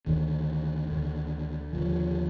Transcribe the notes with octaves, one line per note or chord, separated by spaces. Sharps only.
D2 D3 D#3
D2 D3
D#2 D3 F3